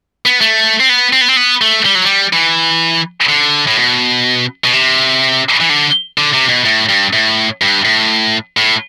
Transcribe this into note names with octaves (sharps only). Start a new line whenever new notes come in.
B3
A3
C4
B3
C4
B3
C4
B3
A3
G3
F#3
G3
E3
D3
A2
B2
B2
C3
E3
D3
D3
C3
B2
A2
G2
A2
G2
A2
A2